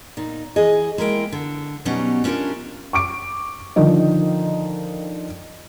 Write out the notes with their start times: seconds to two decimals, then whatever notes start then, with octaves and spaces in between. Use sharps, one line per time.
0.17 A#2 D#4
0.56 E3 G#4 D#5
0.98 G#3 A#3 E4 A#4 G5
1.32 D3
1.85 B2 F#3 G3 C#4 D#4
2.24 B3 C#4 D4 F4 G4 A#4
2.93 C#6 D6 D7
3.76 D3 D#3 F3 D#4 D#5